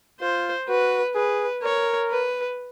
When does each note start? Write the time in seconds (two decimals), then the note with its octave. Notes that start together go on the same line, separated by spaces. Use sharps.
0.20 F4 C5
0.69 F#4 B4
1.15 G#4 B4
1.63 A#4 C#5
2.10 B4